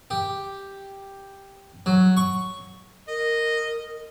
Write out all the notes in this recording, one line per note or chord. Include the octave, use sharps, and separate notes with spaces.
G4
F#3
C#6
A#4 D#5